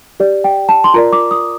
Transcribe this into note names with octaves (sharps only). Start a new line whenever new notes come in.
G4 D5
G5
A5
C6
F4 A#4 D5 A#5
D6
D#6